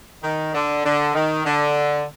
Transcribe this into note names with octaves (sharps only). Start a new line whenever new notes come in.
D#3
D3
D3
D#3
D3